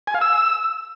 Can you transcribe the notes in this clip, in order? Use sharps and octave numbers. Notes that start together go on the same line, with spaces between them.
G#5
F5
E6